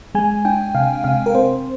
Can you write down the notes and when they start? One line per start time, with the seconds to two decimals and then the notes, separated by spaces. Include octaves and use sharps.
0.15 G#3 G#5
0.45 D4 G5
0.75 C3 F5
1.04 C3 F5
1.26 A#4
1.35 C4 C5